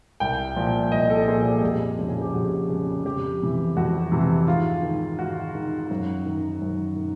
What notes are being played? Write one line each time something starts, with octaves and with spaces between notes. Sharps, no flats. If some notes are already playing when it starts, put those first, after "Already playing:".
C2 G5
A#2 F3
C2 D#5
A4
A#2 F3 G#4
G4
F2
C#3 F3
G#4
G4
F2 F#4
C#3 F3
F2 G4
C3 E3
F2 F#4
C3 E3
G#2 F4
D#3
G#2 F#4
D#3
F#2
D#3
F#2
D#3